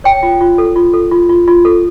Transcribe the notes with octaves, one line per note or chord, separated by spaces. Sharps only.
C#5 G5
F4
F4
A4
F4
A4
F4
F4
F4
A4